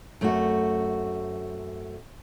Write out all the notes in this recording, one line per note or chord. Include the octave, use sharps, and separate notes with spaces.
F#2 A3 C4 F4 F#4